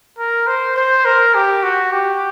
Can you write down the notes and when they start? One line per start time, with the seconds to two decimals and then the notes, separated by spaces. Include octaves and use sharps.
0.18 A#4
0.47 C5
0.76 C5
1.05 A#4
1.35 G4
1.63 F#4
1.93 G4